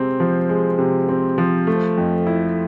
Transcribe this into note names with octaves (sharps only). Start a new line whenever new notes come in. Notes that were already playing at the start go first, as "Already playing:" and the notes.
Already playing: C3 G#3 C4
F3
G#3
C3
C4
F3
A3
F2
E4